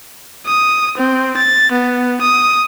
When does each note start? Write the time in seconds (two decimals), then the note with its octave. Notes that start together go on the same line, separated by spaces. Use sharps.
0.46 D#6
0.98 C4
1.37 A6
1.72 B3
2.21 D#6